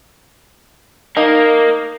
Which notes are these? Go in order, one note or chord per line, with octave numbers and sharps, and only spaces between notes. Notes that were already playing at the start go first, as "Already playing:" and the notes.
A#3 D#4